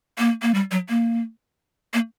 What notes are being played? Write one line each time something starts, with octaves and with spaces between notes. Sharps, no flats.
A#3
A#3
G3
F#3
A#3
A#3